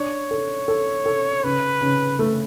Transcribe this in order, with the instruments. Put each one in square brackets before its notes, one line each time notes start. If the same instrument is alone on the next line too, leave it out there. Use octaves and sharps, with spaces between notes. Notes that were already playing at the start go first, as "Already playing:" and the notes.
Already playing: [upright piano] D4 [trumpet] C#5
[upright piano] A4
A4
A4
[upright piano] C#3 [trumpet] B4
[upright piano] C#3
A3